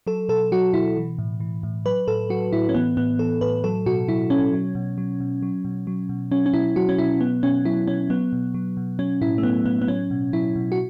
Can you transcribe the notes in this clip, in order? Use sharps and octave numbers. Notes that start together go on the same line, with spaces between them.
F#3 A4
B2 A4
F#3 F#4
B2 E4
E3
A2
E3
A2
F#3 B4
A2 A4
F#3 F#4
A2 E4
C#4
E3 B3
A2 B3
E3 A4
A2 B4
F#3 A4
B2 F#4
F#3 E4
B2 C#4
F#3
B2
F#3
B2
F#3
B2
F#3
B2
F#3 C#4
C#4
B2 E4
F#3 F#4
C#4
B2 E4
F#3 B3
B2 C#4
F#3 E4
B2 C#4
F#3 B3
B2
F#3
B2
F#3 C#4
A2 E4
A3
F#3 B3
A2 B3
B3
F#3 C#4
B2
F#3 E4
B2
F#4